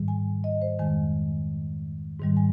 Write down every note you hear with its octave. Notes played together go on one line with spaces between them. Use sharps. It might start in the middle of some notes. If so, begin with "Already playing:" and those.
Already playing: G#2 D#3 G3
G#5
D#5
C5
F2 D#3 G#3 G#5
G#2 D#3 G3
G#5